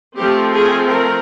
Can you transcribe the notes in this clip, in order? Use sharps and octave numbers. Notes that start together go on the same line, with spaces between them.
F3 A3 C4 G4
G#4
A#4